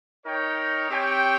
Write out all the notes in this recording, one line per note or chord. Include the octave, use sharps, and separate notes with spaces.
D#4 A#4 C#5 G5
C4 G4 C#5 G5